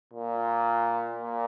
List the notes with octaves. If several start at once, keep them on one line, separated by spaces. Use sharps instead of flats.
A#2
A#2